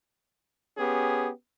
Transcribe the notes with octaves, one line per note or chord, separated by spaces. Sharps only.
B3 C#4 G4 G#4